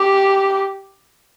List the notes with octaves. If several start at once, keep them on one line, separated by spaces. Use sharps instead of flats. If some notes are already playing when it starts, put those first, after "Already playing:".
Already playing: G4